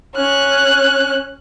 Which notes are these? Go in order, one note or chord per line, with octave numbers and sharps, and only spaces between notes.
C#4 F#6